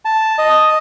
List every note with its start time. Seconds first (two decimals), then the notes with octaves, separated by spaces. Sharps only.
0.05 A5
0.38 D#5